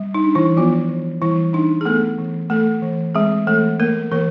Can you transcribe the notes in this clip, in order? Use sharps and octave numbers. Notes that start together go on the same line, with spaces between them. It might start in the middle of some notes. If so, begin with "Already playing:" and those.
Already playing: G3
D#4
D4
E3 E4
F3 B3 F4
E3
E3 G3 E4
D4 D#4
G#4
A3 B3 A4
E3
A3 A4
E3
G#3 C4 G#4
E3 A3 A4
A3 A#3 A#4
E3 A#3 A#4